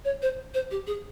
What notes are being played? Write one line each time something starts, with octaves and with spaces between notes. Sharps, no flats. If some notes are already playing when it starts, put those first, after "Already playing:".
C#5
C5
C5
G4
G#4